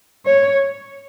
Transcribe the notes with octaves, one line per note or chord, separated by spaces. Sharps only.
C#5